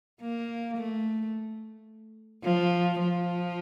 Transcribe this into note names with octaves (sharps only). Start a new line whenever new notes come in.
A#3
A3
F3
F3